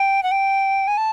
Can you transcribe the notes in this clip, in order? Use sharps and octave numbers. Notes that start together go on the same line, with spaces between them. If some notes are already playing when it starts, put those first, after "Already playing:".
Already playing: G5
F#5
G5
G#5
A5